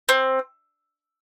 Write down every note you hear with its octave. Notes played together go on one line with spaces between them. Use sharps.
C4